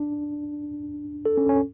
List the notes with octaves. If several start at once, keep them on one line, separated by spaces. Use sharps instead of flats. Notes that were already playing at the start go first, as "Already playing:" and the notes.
Already playing: D4
A4
C#4
C#4